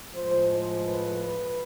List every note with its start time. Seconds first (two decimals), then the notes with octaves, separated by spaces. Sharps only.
0.13 A2 F3 G#3 C5
0.48 C5
0.83 B4
1.18 B4